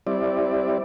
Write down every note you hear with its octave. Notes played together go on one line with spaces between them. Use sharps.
G3 C4 E4 D5